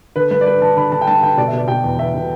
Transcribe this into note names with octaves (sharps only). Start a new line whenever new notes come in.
D3 B4
G2 B4
D5
G2 B4
D3 A5
D3 B5
D3 A5
G5
G2 A5
D3 G5
B2 D5
E5
B2
D5
B2 G5
E2
E2 E5
B2